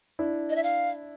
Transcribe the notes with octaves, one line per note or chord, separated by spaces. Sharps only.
D4 E4
D#5
E5
F5